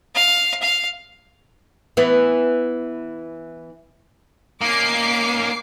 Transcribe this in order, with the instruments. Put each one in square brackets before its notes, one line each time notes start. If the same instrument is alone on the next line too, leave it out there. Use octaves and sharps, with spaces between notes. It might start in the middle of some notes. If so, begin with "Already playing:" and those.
[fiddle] F5
F5
[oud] E3 B3
[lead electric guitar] A#3 [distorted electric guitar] C#4 D#4 [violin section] D6 C7